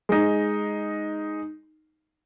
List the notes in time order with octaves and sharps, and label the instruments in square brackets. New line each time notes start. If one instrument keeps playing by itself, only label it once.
[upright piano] G#3 D#4